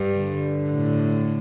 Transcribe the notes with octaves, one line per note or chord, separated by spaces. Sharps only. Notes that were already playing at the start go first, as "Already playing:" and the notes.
Already playing: G2
D3
A2